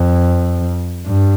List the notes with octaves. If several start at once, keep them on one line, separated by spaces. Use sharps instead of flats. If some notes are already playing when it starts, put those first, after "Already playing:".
Already playing: F2
G2